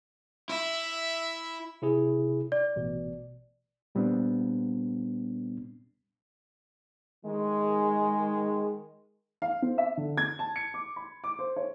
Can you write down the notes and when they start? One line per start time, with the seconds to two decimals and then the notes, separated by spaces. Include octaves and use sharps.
0.49 E4 E5
1.82 C3 E4 G#4
2.52 D5
2.76 A1 B2
3.95 A#2 G3 B3 C4 D4
7.25 D#3 G#3
9.42 F5
9.62 C4
9.78 E5
9.97 D3
10.17 G#6
10.39 A5
10.56 C#7
10.74 D6
10.96 B5
11.24 D6
11.39 C5
11.56 C#5